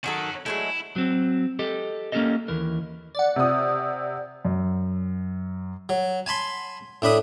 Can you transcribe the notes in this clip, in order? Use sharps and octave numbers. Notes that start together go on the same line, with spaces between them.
D#3 F#3 C#4 F#4 A4
F#3 G#3 A3 E4
F#3 C4
G4 A4 D#5
A#3 C#4 D4 G4 A4 D#5
D#2 E3 A#4
D5 F#5
C3 D#6
F#2
F#3
G#5 A5 B5 C6
A2 D4 B5 D#6